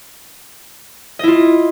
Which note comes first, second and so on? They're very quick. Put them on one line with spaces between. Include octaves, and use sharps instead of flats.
D#5 E4 F4